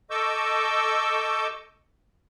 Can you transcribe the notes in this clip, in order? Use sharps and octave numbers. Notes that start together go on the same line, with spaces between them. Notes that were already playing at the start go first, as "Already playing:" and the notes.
A4 D#5 C#6 D6 E6 G6